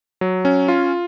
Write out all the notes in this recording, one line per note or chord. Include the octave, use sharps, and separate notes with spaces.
F#3
C#4
F4